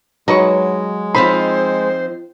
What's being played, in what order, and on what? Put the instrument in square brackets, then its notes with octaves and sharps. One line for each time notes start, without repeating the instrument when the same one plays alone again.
[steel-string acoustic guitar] F#3 [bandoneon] G#3 [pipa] D#4 B4 C#6
[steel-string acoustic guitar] F3 C4 D#4 [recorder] C5 [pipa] B5 C6